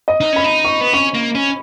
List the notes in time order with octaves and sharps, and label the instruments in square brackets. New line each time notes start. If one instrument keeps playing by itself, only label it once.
[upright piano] D#5
[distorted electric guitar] D#4
[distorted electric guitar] C#4 [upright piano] B5
[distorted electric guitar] D#4
[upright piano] C#6
[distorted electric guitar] B3
[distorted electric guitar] C#4 [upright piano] C#6
[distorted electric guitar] A#3
C#4